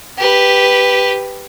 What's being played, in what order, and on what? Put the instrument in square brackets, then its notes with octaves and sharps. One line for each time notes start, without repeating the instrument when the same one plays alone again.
[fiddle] G4 B4